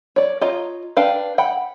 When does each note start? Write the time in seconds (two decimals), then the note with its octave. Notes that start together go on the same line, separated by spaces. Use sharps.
0.16 C#5 D5
0.41 F4 C#5 D#5 A#5
0.97 D4 B4 F5 G5
1.38 F#5 G5 B5